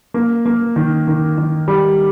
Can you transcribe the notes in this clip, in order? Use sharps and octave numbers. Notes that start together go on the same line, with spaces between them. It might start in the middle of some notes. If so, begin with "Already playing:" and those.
A#3
A#3
D#3
D#3
D#3
G3